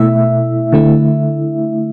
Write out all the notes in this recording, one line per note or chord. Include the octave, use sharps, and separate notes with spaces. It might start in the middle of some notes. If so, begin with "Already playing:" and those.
Already playing: B2 A3 E4 E5
D3 A3 E4